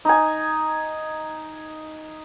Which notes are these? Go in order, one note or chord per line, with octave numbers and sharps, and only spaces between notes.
D#4 G#5